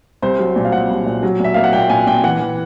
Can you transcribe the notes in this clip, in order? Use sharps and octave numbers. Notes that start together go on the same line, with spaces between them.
C2 C5
F#3
A#2
F5
A#2 F#5
C2
A#2
F#3
A#2 E5
A#3 F5
F#5
A#2 G5
A#2 G#5
A#2 G5
E3 F#5
E3